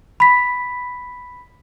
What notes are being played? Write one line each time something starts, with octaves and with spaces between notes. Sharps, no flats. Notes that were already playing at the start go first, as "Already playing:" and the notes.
B5 B6